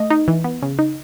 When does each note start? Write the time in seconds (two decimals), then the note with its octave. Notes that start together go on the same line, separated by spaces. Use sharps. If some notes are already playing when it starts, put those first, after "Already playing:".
Already playing: A3 D#5
0.10 D#4
0.28 E3
0.44 B3
0.62 C#3
0.79 D#4